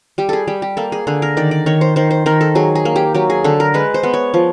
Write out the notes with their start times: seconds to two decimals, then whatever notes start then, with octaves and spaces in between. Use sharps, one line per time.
0.18 G3 G4
0.29 G#4 A4
0.47 G3 G4
0.62 G4
0.77 A#3 A4
0.92 G#4
1.07 D3 G#4
1.22 A#4
1.37 D#3 D5
1.51 D5
1.66 D#3 C#5
1.81 C5
1.96 D#3 C5
2.11 C5
2.26 D#3 A#4
2.41 A4
2.55 F#3 G#4
2.75 G#4
2.85 A#3
2.96 G4
3.15 F#3 G4
3.30 G#4
3.44 D3 A4
3.60 A#4
3.74 G#3 B4
3.94 C5
4.03 B3
4.14 C#5
4.34 F3